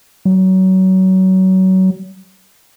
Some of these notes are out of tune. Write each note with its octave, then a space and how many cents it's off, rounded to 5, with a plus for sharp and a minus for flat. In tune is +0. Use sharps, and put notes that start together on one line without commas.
F#3 +25